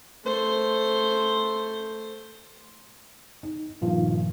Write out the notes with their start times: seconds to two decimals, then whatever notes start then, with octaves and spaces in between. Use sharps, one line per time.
0.25 A3 C5
3.43 D#4
3.81 G2 A#2 D#3 F3